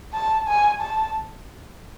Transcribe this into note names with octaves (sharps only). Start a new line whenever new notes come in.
A5
G#5
A5